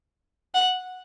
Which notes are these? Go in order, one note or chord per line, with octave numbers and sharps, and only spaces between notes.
F#5